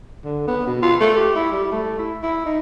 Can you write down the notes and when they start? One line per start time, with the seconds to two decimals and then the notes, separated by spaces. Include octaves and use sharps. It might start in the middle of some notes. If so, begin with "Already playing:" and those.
0.24 D3
0.48 B3
0.67 B2
0.82 F4
1.01 A3
1.16 G4
1.35 E4
1.52 G3
1.72 A3
1.99 E4
2.23 E4
2.46 D#4